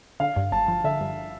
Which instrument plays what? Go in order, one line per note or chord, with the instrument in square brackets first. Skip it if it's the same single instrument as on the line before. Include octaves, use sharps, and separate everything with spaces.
[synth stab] D3 [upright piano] F5
[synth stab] G2
[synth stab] G1 [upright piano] A5
[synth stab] F3
[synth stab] D3 [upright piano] E5
[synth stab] G2